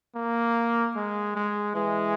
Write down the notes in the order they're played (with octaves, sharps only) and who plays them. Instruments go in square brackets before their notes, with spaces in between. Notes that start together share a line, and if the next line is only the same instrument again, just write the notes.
[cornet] A#3
G#3
G#3
[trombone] E3 [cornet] G#3